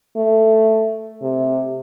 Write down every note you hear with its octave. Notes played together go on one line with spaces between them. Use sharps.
A3
C3